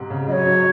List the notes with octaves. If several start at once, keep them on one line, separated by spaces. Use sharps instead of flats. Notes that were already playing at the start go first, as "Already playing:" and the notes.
Already playing: G#2 C3
C#3
F#3 D#5
C#5
F#3